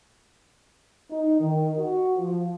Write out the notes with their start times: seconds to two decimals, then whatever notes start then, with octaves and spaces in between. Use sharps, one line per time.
1.10 D#4
1.40 D#3
1.78 F#4
2.17 F3